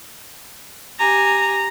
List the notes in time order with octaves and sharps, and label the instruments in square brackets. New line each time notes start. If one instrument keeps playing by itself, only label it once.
[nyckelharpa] G4 G#5 [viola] A#5